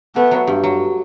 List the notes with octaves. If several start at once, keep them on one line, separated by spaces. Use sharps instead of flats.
A3 B3
F#3
G2
F#3